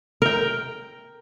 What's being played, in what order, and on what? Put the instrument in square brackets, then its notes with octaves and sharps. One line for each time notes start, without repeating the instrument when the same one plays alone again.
[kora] A#4 G5